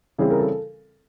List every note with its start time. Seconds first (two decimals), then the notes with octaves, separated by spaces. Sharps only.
0.18 C#3 E3 G3 C4 E4 G#4
0.30 A#4
0.39 A4